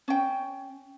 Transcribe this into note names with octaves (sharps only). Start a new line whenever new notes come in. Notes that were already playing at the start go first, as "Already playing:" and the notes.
C#4 G5